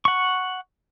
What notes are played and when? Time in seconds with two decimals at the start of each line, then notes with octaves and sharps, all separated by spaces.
0.05 F#5 C#6